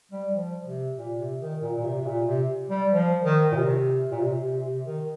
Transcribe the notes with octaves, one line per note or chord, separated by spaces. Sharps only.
G3
F3
C3
A#2
C3
D#3
A#2
A#2
C3
C3
A#2
C3
G3
F3
D#3
A#2
C3
A#2
C3
C3
C3
D#3